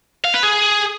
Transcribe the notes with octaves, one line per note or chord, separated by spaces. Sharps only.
F5
B4
G#4